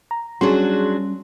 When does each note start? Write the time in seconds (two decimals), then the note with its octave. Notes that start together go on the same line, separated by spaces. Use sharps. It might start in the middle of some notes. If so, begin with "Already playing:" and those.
0.11 A#5
0.41 F#3 G3 C#4 D4 F#4 G#4 C6